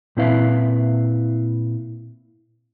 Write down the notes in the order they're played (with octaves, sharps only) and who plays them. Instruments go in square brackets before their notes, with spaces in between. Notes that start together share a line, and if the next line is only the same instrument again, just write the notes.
[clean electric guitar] A#2 C4 E4 B4 E5 F5